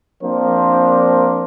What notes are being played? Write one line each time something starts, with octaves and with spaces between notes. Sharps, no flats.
F3 A#3 C4 D4 A#4 C5